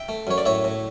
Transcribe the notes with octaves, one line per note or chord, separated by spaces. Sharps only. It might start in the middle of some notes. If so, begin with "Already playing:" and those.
Already playing: E5 G5
A3
F#2 C#5
D5
A2 C#5 E5
A2